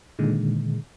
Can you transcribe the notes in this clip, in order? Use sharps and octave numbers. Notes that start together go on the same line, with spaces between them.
A#2 D3 D#3 G#3